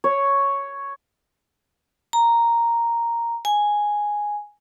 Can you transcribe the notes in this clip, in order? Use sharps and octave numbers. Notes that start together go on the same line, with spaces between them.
C#5
A#5
G#5